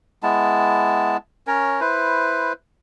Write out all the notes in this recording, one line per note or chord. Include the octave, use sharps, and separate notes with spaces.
G#3 B3 E4 A5
C#4 A#4 C#5
E4 B4 C5